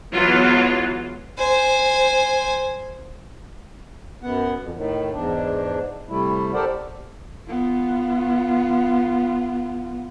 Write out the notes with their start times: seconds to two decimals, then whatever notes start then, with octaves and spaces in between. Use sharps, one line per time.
0.13 E3 F#3 G#3 B3 F4
1.38 C5 G#5
4.23 F#2 B3 F#5
4.60 F2
4.75 A2 D#3
5.13 E2 G#2 D4
6.09 C3 G3 A3 E4
6.54 G4 A4 A#4 C5 D5 F#5
7.49 B3 F4